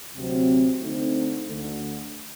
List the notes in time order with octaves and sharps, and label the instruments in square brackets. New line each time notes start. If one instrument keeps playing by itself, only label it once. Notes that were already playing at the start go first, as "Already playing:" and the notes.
[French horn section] D2 C3 F#3 C4
D3 A3 C4 D#4
D2 D3 A3